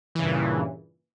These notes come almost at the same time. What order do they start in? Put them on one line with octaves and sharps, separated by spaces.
E3 C#3 G2 A#2